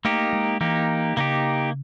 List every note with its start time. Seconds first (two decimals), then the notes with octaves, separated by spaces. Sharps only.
0.05 A3 A#3 D#4 G4
0.33 G#3
0.61 E3 A#3 D#4 G4
1.17 C#3 A#3 D#4 G4